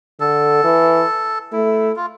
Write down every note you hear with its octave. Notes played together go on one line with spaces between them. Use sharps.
D3 A4
E3
A3 E4
F4